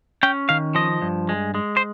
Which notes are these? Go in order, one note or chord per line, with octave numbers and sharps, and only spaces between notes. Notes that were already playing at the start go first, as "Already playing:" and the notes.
C#4 G5
D#3 F5
F3 D#5
G2
G#3
G#3
C5